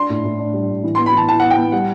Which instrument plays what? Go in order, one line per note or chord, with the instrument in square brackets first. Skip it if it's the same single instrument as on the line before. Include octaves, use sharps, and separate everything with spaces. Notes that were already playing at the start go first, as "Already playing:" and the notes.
Already playing: [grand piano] D4 [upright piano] C6
[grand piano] A2
A2
D4
G3
A2
E3
[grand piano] B3 [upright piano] C6
[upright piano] B5
[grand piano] E3 [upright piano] A5
[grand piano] E4 [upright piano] A5
[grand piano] B3 [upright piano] F#5
[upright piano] G5
[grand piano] B3
[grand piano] G3 [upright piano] F#5